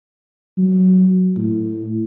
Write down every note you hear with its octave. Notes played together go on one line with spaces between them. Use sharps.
F#3
A2